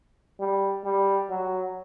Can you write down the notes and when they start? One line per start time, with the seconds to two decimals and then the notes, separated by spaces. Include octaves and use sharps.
0.40 G3
0.85 G3
1.29 F#3